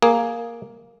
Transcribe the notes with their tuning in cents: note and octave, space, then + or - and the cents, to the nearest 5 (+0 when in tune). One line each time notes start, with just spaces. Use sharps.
A#3 +0 G#4 +0